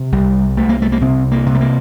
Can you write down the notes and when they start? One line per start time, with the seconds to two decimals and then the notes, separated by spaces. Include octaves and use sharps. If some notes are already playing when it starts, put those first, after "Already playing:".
Already playing: C3
0.12 C2 G3
0.57 C2 A3
0.69 A#3
0.82 A3
0.92 A#3
1.01 C3 C4
1.32 A#3
1.46 C3
1.54 A3
1.61 A#3